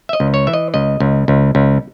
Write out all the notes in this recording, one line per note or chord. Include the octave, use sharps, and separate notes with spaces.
E5
D#5
C#2
C#5
E3 E5
D#5
C#2 D#5
C#2
C#2
C#2